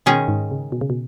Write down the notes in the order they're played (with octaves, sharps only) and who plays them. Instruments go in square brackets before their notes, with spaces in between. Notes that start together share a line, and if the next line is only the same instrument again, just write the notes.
[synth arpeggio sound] B2 [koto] D#3 G#3 C#4 G#4
[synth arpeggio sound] G#2
C#3
B2
C#3
B2